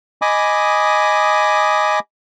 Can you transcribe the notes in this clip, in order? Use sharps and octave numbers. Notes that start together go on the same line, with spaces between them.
D#5 G#5 B5 D6 D#6